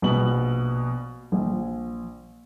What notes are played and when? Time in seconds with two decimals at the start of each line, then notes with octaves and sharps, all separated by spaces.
0.02 A#1 B2 B4 F#7
1.32 A#1